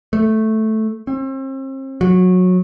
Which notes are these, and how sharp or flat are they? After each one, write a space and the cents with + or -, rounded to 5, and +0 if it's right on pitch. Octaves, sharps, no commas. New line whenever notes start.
A3 -5
C4 +40
F#3 -20